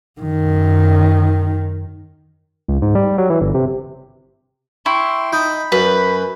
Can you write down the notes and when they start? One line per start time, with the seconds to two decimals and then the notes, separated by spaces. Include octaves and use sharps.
0.21 F#2 D#3
2.68 C#2
2.82 G#2
2.95 G3
3.18 F#3
3.30 E3
3.41 G1
3.54 C3
4.86 E4 G5 C6 C#6
5.33 D#4 B5 G6
5.72 F#2 B4